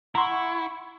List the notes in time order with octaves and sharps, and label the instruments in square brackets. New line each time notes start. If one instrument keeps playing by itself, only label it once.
[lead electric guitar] E4 [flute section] F#5 C#6 [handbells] A#5 C6